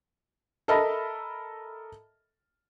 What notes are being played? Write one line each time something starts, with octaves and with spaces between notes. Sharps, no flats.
A4 A#4 D#5 E5 A5 B5